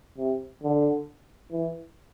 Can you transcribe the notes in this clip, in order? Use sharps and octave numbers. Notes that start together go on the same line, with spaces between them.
C3
D3
E3